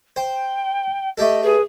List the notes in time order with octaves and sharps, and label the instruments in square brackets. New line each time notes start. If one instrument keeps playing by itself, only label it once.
[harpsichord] C5 [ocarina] G5
[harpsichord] A3 G4 A4 [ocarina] D#5
[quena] G#4 [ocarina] B4